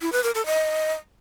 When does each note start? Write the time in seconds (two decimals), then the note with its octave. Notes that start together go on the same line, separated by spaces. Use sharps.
0.01 E4
0.12 B4
0.24 A#4
0.35 A4
0.46 D#5